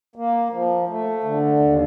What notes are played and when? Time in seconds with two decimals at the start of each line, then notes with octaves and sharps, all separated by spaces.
0.16 A#3
0.52 F3
0.88 A3
1.24 D3
1.59 D#2